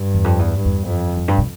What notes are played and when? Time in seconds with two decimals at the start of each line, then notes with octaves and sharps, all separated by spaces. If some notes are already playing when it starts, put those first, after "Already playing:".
Already playing: G2
0.14 E2
0.24 F2
0.39 E2
0.56 G2
0.65 E2
0.86 F2
1.17 F2
1.28 G2
1.38 B2